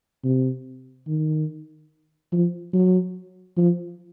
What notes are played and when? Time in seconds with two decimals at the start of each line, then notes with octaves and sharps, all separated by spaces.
0.24 C3
1.07 D#3
2.33 F3
2.73 F#3
3.57 F3